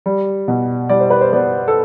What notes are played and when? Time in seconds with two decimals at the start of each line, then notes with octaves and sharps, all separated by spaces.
0.06 G3
0.48 B2
0.89 G3 D5
1.00 C5
1.10 B4
1.21 C5
1.33 B3 D5
1.68 A4